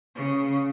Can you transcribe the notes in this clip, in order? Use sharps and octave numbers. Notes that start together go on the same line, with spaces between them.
C#3